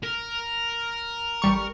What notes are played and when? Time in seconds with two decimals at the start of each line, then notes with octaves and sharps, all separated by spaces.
0.04 A#4
1.42 A1 G3 C#6